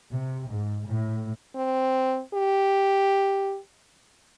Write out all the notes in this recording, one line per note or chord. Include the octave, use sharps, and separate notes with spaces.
C3
G#2
A2
C4
G4